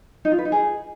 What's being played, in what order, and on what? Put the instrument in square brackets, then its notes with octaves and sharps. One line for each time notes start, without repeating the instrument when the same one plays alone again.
[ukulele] D#4
F4
B4
D#4
G#4